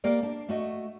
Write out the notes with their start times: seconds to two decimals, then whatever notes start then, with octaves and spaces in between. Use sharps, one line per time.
0.04 A#3 G4 A#4 D5
0.23 D4
0.48 A3 F#4 D#5